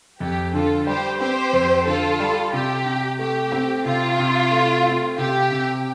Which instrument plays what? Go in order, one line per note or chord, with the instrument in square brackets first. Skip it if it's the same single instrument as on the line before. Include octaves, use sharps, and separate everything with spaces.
[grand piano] F2 [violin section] G4
[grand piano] D3 [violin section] F4 A4
[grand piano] G3 [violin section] G4 C5
[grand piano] C4 [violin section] G4 C5
[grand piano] F2
[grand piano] D3 [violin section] F4 A4
[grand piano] G3
[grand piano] C3 [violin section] G4
[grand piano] C3
[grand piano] A3 [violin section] G4
[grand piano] C4
[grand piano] C3 [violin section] F4
[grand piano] C3
A3
C4
[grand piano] C3 [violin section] G4
[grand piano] C3